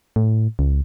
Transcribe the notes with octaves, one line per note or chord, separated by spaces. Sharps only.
A2
C#2